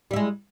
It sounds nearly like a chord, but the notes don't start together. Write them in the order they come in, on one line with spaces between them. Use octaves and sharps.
G3 E4 G#3